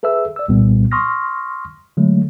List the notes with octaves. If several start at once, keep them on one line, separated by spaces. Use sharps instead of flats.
G#4 A4 B4 E5 E6
D5 E6
C2 A#2 G3 B3
C6 C#6 D#6 F6 A#6
D3 F#3 G#3 A3